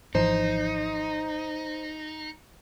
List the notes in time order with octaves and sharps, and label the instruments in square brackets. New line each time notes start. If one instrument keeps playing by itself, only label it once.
[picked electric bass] G#1 E3 F3 [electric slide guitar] D#4 [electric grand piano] C5